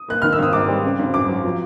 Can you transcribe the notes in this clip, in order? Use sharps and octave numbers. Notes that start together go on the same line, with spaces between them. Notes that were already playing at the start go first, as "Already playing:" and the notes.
Already playing: D#6
A#3 F#6
D#3 F6
E6
G#1 D#6
G#2 D6
G3
C#3
G#1
F#2 D6
F#3
F3